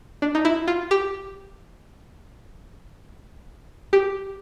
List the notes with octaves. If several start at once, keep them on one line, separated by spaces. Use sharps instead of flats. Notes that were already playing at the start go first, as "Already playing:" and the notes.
D4
D#4
E4
F4
G4
G4